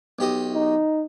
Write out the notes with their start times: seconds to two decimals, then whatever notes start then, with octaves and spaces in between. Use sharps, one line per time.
0.19 B1 G4 D#5
0.53 D#4